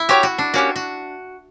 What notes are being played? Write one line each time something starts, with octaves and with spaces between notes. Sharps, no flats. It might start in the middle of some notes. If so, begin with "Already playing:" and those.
Already playing: E4
F#4 G4 C#5 G5
F#4
D4
A#3 C#4 F#4 G4
F#4